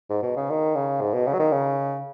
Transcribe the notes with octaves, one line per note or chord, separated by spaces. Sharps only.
G#2
B2
C#3
D#3
C#3
G#2
B2
C#3
F#3
D#3
C#3